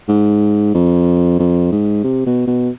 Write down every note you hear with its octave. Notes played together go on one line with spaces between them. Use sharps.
G#2
F2
F2
G#2
C3
B2
B2